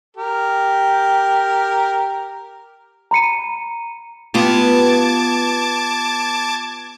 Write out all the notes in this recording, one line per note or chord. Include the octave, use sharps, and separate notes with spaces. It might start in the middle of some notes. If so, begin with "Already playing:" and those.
G4 A#4
A#5 B5 C#7 D#7
B3 F4 G4 A5 D6 G#6